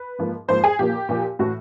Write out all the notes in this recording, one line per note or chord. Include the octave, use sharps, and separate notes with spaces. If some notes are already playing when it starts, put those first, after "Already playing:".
Already playing: B4
G#2 F3 A#3
G#2 F3 A#3 C5
G#4
A#2 F3 A#3 G4
A#2 F3 A#3
A2 E3 A3 F#4